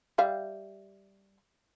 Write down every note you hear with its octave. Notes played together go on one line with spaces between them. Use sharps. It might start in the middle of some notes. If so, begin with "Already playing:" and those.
G3 E5 F5